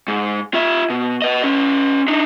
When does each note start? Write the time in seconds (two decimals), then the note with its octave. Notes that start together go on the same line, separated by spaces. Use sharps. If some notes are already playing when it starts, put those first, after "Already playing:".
0.08 G#2
0.54 F4 E5
0.90 B2
1.22 B4 D#5
1.44 C#4 B4
2.08 D4 D#4